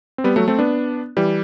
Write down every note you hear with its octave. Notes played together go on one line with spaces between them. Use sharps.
C4
G3 B3
F#3 A3
A3 C4
B3 D4
E3 G3